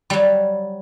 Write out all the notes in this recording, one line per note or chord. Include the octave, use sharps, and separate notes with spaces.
F#3 G3